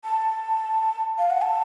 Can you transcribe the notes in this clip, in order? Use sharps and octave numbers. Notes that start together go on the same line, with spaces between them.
A5
F5
F#5
A5